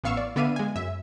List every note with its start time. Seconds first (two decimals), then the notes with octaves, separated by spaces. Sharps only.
0.04 A1 B3 F5 C#6 E6
0.17 D5
0.36 D3 B3 D5 E5 F5 D#7
0.56 G#3 G#5
0.75 F#2 E5